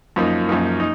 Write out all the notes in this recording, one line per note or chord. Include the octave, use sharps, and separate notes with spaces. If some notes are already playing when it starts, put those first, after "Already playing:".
F#2 F3 A#3 D#4
F#2 F3 A#3 D#4
D#4